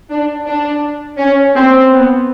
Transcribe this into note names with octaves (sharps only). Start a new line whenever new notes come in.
D4
D4
C#4
C4
B3